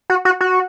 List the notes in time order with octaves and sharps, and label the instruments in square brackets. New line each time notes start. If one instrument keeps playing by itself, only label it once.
[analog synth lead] F#4
F#4
F#4